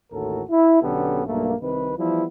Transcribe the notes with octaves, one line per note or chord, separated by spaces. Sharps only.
A1 D#2 A2 F#4 A4 A#4
E4
B1 D3 B3 C#4 G4 A4
B1 G2 A3 A#3
C2 C3 D#3 B4
E3 F3 G3 B3 E4